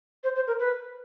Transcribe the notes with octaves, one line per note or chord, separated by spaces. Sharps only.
C5
C5
A#4
B4